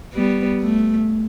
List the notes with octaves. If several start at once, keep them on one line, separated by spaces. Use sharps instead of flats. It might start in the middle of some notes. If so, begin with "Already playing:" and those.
G3 B3
A3